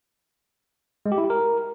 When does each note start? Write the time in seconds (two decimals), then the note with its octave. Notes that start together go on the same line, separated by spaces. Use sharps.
1.06 G#3
1.12 G4
1.18 E4
1.24 G4
1.30 A#4